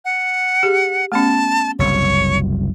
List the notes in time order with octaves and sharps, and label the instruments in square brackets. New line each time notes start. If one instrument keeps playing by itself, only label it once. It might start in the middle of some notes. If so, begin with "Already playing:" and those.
[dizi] F#5
[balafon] G4 G#4
[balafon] A3 B3 C#4 [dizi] A5
[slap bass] F#1 C2 [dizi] C#5